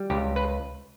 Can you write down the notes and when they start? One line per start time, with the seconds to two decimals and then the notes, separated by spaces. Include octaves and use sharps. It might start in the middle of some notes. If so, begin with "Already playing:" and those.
Already playing: G3
0.10 C#2 G4
0.36 B4